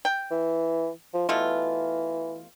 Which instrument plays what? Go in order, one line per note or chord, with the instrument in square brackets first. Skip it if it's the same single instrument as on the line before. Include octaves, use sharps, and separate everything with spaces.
[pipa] G5
[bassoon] E3
F3
[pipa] B2 A3 F4 [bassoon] E3